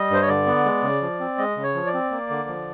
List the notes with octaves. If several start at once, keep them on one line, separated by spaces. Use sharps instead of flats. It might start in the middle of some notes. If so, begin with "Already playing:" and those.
Already playing: G3 D#5
G2 C5
C#5
D3 D5
B3
G#3
C#3
F3
C4
G#3 D#5
C#3
C#5
F3
D5
C4
A#3
D3
F3